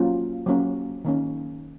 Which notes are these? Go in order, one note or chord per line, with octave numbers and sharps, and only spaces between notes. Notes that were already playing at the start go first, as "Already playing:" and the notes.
Already playing: F#3 A#3 C#4 F4
F#3 A#3 C#4
D#3 A#3 C#4